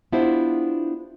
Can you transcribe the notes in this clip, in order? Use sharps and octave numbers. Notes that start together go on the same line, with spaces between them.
B3 D4 E4 F4 G4 C5